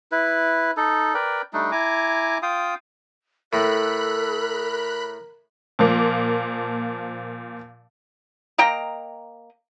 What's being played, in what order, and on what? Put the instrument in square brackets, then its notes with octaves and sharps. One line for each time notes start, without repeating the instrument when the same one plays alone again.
[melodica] E4 B4
D#4 A4
A#4 B4 D5 G5
G3 A3 D4 D#4
E4 G#5 A#5 D6
F4 F5 G5 D#6
[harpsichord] A2 [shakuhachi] A4 [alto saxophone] A#4 [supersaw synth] B5 F#6
[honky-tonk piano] A#2 F3 A#3
[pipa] A#3 D#5 G5 A#5